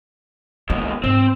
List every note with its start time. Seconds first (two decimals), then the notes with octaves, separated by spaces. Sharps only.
0.70 D#2 B2 G#3
1.04 G#2 C4